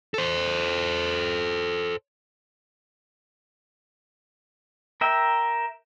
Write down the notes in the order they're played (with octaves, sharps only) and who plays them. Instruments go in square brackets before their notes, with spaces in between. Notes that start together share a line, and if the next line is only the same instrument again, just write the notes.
[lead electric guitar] A4 C5
[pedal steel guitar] A#4 E5 G5